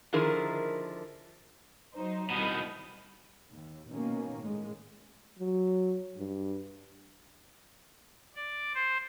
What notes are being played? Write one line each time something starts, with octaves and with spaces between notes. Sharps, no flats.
D3 D#3 F3 E4 G#4 A#4
F#3 D#4 C5
C2 B2 D#3 B5 D#6
D#2
B2 D#3 A#3 C#4
A2 G#3
F#3
G2
D5
C5